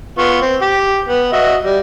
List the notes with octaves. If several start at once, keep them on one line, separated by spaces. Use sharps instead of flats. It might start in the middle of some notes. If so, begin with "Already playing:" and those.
B3 F4 C#6
C4
G4 D6
B3
F#4 D#5 E5
G3